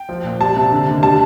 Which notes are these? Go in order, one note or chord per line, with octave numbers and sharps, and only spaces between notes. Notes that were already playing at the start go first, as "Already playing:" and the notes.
Already playing: G5
F3
A#2
G3 A5
C3
D3
D#2
G3 A5